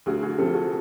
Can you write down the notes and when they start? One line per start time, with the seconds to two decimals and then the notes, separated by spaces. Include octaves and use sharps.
0.06 D2 F#4 G#4
0.22 F#4 G#4
0.38 C3 F3 G4 A4
0.54 F#4 G#4